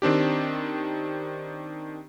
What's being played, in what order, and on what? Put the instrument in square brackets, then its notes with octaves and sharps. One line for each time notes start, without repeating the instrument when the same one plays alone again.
[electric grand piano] D#3 C4 D4 G4